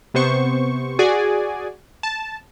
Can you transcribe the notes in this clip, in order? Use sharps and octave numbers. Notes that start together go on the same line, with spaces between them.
C3 B3 C5 C#6
F#4 G#4 D5 G#5
A5